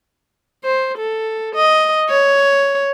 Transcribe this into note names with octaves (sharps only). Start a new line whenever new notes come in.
C5
A4
D#5
C#5